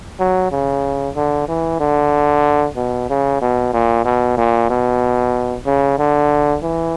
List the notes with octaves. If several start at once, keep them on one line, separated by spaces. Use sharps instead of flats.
F#3
C#3
D3
E3
D3
B2
C#3
B2
A#2
B2
A#2
B2
C#3
D3
E3